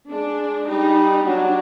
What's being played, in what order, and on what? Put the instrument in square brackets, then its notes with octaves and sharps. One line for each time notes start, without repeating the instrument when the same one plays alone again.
[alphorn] G#3 [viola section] D4
[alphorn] G3 [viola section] D#4
[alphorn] F#3 [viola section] D4